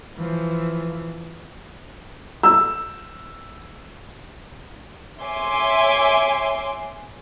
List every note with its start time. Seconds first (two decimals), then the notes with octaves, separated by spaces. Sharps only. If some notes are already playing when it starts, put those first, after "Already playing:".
0.17 E3 F3
2.43 E6
5.21 C#5 E5 G#5 C6 D6